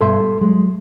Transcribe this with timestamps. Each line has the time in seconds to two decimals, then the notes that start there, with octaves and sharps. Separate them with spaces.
0.01 G2 B2 A4 E5 C6
0.20 G3
0.41 F#3 G#3